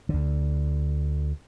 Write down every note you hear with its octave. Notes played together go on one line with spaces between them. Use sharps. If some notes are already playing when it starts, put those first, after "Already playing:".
D2 D3